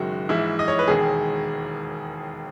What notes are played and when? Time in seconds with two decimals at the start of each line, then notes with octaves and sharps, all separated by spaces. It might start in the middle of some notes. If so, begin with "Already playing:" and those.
Already playing: F#1 F#2 D#3 G#3 F#4
0.29 A#1 G#2 E3 G#3 E4
0.59 D#5
0.68 C#5
0.79 B4
0.88 E1 D#2 D#3 G#3 G#4